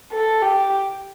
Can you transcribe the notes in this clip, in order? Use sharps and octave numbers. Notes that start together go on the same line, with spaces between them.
A4
G4